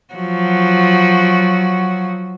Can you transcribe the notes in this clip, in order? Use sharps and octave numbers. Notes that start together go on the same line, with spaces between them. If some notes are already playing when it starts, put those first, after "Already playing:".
F3 F#3 F#4